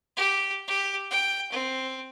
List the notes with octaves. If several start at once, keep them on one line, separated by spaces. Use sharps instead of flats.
G4
G4
G5
C4